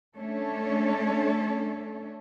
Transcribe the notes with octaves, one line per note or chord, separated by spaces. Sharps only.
A3 C#4 D4 A4 C#5